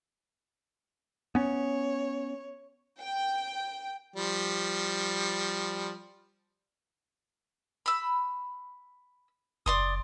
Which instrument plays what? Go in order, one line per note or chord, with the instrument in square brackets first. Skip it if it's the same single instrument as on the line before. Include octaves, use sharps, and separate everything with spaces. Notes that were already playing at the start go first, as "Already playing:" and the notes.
[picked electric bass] B3 C#4 [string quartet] C#5
[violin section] G5
[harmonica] F3 G3
[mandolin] B5 E6
[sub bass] F#1 [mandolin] D5 C6 D#6